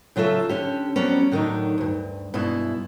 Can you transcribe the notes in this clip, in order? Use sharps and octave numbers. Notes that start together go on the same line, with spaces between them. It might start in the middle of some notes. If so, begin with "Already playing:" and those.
C#3 F#3 F4 A4 E5
D3 C#4 G4
F2 F#3 G3 B3 C#4
A2 D3 D#3 F#3 D#4
D2 G2
G2 B2 G#3 E4